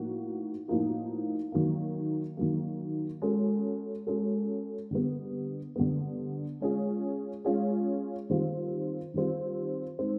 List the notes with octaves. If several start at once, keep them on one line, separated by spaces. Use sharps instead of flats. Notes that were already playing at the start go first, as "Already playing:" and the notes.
Already playing: A2 F3 A#3 D#4 F#4
A2 F3 A#3 D#4 F#4
D#3 F#3 A#3
D#3 F#3 A#3
G#3 C#4 F#4 A4
G#3 C#4 F#4 A4
D3 G3 B3
D3 G3 B3
G#3 C#4 F4 G#4
G#3 C#4 F4 G#4
D#3 G3 C4 F4
D#3 G3 C4 F4
G#3 C4 D#4